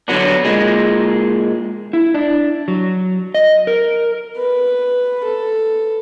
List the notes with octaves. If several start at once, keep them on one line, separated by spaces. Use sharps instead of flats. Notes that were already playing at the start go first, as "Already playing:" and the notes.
D3 D#3 F#3 B3 D4
A#2 G#3
E4
D4
F#3
D#5
A#4
B4
A4